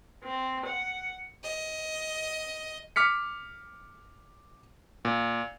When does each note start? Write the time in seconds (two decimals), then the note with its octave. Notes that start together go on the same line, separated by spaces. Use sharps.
0.24 C4
0.66 F#5
1.44 D#5
2.96 D6 F6 B6 C#7
5.05 A#2